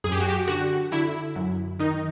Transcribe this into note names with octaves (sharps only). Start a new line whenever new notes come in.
F#2 G#4
G4
F#4
G4
D3 F#4
D3 E4
F#2
D#3 D#4